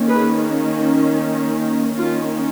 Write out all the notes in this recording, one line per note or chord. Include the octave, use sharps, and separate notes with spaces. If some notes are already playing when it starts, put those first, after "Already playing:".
Already playing: D#3 A#3 C#4
G#4 B4
D#3 A#3 C#4 F4